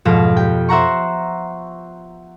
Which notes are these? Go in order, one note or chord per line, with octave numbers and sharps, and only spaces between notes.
F2 G#2 B2 F5 A#6 E7
G4 G5
C5 E5 F#5 A#5 C#6